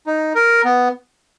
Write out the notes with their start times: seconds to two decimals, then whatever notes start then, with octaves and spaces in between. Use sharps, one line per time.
0.06 D#4
0.35 A#4
0.64 B3